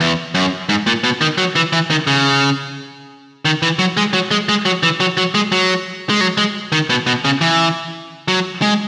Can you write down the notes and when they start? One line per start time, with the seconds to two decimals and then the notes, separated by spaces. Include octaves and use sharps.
0.01 E2
0.35 F#2
0.69 G#2
0.87 A#2
1.04 B2
1.21 D#3
1.38 F#3
1.56 E3
1.73 E3
1.90 D#3
2.07 C#3
3.45 D#3
3.62 E3
3.79 F#3
3.97 G#3
4.13 F#3
4.31 G#3
4.49 G#3
4.65 F#3
4.83 E3
5.00 F#3
5.17 F#3
5.35 G#3
5.52 F#3
6.10 G#3
6.21 F#3
6.37 G#3
6.72 D#3
6.90 B2
7.07 B2
7.25 C#3
7.41 E3
8.28 F#3
8.62 G#3